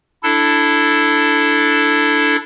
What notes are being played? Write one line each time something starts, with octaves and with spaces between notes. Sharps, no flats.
D4 E4 A4